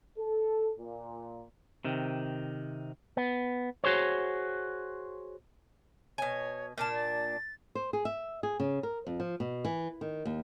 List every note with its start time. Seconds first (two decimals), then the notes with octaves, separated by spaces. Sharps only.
0.19 A4
0.79 A#2
1.85 C3 D#3
3.17 B3
3.84 F#4 G#4 C5 C#5
6.18 B2 C#5 G#5
6.78 A#2 D4 A5 F6
6.95 A6
7.75 C5
7.93 G#4
8.05 E5
8.43 G#4
8.60 C#3
8.83 A#4
9.07 F2
9.20 F3
9.40 B2
9.65 E3
10.01 D#3
10.26 D#2